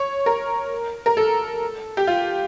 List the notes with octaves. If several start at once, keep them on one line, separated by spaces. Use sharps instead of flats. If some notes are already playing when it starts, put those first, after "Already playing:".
Already playing: C#5
A#4
A#4
A4
G4
F4